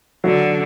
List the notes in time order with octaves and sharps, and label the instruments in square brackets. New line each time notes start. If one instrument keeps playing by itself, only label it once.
[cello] D3 [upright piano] F#3